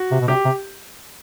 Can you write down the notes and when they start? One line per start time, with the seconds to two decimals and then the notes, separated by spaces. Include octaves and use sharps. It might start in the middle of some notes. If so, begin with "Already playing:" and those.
Already playing: F#4
0.11 C3
0.21 B2
0.28 C3 G4
0.45 C3